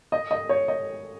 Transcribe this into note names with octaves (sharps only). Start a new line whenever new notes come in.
D#5
D#5
C#5
D#5